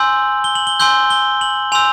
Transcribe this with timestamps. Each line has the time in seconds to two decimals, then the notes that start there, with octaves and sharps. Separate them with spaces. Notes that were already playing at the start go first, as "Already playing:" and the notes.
Already playing: G#5 C6 E6 G6 F#7
0.44 G7
0.55 F#7
0.67 G7
0.80 G#5 C6 E6 G6 G7
1.10 G7
1.41 F#7
1.72 G#5 C6 E6 G6 F7